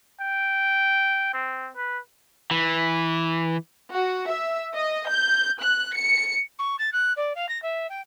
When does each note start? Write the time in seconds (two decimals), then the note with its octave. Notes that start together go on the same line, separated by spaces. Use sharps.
0.20 G5
1.33 C4
1.77 B4
2.51 E3
3.93 F#4
4.30 E5
4.75 D#5
5.08 G6
5.60 F#6
5.95 C#7
6.59 C#6
6.79 A6
6.93 F#6
7.17 D5
7.36 F5
7.49 A#6
7.63 E5
7.90 G5